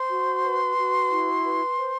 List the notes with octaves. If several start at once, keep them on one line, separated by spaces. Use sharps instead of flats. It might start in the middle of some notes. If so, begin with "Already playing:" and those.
Already playing: C5 C6
F#4
B4
F#4
E4
B4
C5